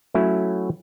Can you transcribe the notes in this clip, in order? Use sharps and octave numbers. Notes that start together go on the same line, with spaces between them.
F#3 A3 C#4 E4 F#4